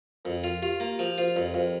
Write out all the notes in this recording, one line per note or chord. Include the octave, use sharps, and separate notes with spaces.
F2 A#4
F4
F4 G4
A#3
F3 A#4
F4 C5
F2 A#4 D5
F2 C5 F5